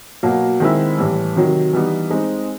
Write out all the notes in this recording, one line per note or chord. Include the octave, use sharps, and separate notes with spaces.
B2 F#3 A#3
D#3 G#3 C4 E4
A2 E3 G3
C3 D#3 F#3
E3 G3 B3 D#4
G#3 C4 D#4